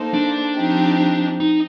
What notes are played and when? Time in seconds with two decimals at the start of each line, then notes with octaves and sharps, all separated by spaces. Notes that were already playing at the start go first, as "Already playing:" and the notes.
Already playing: A#3 D#4 A4 C5
0.14 D4
0.56 F3 C4 D#4 G4
1.40 D#4